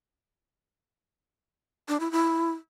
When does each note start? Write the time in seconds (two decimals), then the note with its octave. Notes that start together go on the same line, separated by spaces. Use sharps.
1.88 D4
2.00 E4
2.12 E4